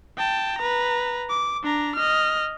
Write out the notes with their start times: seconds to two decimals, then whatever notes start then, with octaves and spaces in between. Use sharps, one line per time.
0.18 G5 A5
0.58 B4 A#5
1.29 D6
1.64 D4 A#5
1.96 D#5 F6